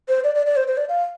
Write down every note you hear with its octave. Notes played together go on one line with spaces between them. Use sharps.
C5
D5
D5
D5
C5
C5
D5
F5